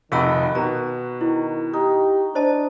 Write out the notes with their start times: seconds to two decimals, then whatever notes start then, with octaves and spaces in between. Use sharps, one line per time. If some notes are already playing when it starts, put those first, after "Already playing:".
0.12 F1 D#3 D#4 F#4 F5 B5 D6 E6
0.55 B2 A#5
1.21 D#3 E4
1.73 D#4 G4
2.35 D4 C5 D#5 A5